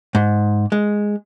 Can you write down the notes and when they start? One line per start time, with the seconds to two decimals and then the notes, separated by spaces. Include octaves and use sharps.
0.15 G#2
0.72 G#3